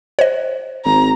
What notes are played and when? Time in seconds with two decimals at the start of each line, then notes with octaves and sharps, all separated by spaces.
0.19 C5 C#5 D#5
0.85 G#1 A#5